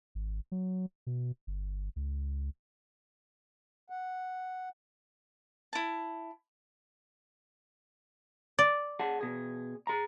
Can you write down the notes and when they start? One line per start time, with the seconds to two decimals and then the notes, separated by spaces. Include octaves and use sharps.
0.15 G#1
0.52 F#3
1.07 B2
1.47 G1
1.96 C#2
3.90 F#5
5.73 E4 A5
8.59 D5
9.00 G#4 F#5 A5
9.21 B2 G#4
9.87 G#4 A#5